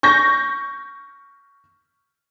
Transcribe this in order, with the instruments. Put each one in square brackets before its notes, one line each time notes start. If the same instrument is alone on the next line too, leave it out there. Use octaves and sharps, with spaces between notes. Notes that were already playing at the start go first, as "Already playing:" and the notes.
[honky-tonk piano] C#6 G6 A#6